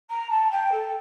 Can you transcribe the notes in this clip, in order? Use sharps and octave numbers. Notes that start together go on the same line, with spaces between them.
A#5
A5
G5
A4